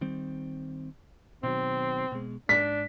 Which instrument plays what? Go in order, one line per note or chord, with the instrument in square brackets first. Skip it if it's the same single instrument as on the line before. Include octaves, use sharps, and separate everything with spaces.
[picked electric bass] D#3 G3 C4
[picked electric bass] B2 D#3 F#3 [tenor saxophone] C4
[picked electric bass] B2 G#3
[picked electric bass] G#2 [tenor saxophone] D4 [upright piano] B6